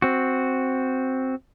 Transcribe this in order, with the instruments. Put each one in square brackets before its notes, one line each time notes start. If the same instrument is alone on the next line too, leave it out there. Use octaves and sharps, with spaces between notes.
[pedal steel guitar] C4 F#4